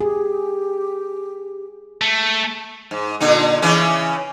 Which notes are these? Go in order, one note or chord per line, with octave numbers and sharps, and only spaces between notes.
G4 G#4
A3
G#2
A#2 D3 D#4
C#3 E3 C#4